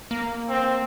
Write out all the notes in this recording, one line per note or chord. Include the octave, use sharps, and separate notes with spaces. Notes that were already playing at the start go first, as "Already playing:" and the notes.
A#3
C4